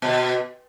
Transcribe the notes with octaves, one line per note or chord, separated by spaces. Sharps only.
B2